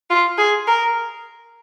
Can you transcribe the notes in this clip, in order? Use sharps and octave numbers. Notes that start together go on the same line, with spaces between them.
F4
G#4
A#4